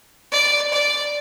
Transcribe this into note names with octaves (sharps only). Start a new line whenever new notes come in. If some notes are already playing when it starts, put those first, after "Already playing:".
D5
D5